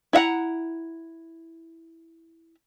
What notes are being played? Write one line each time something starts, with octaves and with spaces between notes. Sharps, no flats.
E4 E5 F#5 A#5